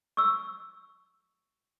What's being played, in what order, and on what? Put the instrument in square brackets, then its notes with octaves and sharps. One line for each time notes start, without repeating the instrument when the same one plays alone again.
[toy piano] C#6 E6